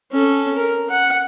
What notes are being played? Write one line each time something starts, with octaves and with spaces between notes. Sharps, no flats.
C#4 A4
A#4
F#5